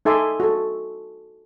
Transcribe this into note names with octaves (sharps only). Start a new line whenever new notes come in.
D#4 A4 E5 G#5 C6 D6
F#4 A4